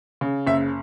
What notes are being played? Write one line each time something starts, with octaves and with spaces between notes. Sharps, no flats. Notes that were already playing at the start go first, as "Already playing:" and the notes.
C#3
F#1 E5